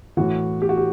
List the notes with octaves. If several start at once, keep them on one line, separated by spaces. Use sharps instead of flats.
A2 E3 F#4
G4
F#4
G4